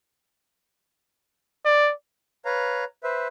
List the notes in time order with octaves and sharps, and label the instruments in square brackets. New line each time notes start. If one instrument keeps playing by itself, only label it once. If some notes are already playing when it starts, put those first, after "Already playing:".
[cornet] D5
[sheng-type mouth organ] B4 C#5 F5 A#5
B4 C5 E5